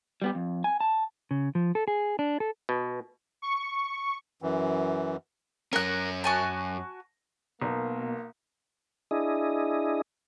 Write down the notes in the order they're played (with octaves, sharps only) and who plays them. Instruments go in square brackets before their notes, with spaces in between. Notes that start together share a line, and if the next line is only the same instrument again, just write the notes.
[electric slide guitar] G3 B3 G4
F2
G#5
A5
C#3
F3
A4
G#4
D4
A4
[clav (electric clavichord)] B2
[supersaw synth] C#6
[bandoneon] F#2 E3
[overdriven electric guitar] F#2 C#4 [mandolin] A#4 F#6
[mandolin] F#4 G#5 A5
[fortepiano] B1 [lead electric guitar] B2 [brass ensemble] A#3
[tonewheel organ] D4 E4 G#4 D#5